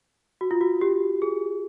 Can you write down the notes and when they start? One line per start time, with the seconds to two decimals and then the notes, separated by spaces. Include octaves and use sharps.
0.41 F#4
0.51 F4
0.61 F#4
0.81 G4
1.22 G#4